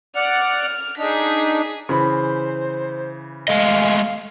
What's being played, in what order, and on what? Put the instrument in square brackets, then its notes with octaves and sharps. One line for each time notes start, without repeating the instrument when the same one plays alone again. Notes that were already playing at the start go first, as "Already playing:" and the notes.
[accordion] D5 F#5 [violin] F6
[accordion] D4 D#4 [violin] G#4 B6
[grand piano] C#3 E3 B5 [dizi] C5
[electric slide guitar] G#3 A3 D#5 [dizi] F5